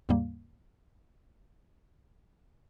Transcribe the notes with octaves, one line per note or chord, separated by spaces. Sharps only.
D#2 G#2 C#3 G3 A#3